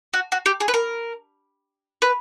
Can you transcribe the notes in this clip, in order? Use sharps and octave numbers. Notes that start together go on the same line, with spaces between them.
F#4
F#4
G4
G#4
B4
A#4
B4